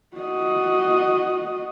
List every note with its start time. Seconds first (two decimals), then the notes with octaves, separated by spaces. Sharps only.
0.17 F#4 D#5